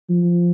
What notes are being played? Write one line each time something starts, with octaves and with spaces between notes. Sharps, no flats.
F3